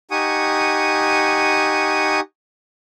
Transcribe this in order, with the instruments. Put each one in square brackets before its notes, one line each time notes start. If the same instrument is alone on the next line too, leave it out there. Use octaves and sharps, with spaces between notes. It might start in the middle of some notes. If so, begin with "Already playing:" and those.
[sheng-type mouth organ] D#4 G4 F#5 G#5 C#6 D#6